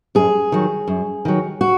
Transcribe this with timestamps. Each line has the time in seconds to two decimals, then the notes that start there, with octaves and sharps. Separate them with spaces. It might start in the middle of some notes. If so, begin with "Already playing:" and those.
0.15 F#2 G#4
0.52 D#3 F#3
0.88 F#2
1.25 D#3 F#3
1.61 F#4